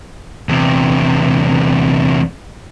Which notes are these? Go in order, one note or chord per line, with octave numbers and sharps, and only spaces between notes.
E2 C3